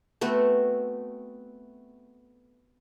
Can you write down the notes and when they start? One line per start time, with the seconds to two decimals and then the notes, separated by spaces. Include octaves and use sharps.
0.21 A3 B3 C4 F#4